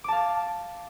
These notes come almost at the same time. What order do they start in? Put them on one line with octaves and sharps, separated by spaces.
D6 A5 F5 A6